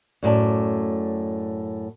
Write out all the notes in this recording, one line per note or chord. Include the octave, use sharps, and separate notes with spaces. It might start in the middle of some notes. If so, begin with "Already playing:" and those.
F#2 A2 D5 A5